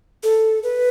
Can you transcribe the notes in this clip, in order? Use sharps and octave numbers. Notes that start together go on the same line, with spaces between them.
A4
B4